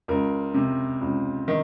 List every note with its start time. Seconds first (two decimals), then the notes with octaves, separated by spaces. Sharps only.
0.08 C#2 A#4
0.54 C3
1.01 C#2
1.48 D#3